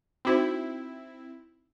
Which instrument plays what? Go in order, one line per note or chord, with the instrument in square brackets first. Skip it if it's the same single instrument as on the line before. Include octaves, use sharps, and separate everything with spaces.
[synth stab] C4 E4 [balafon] D#4 F#4 C5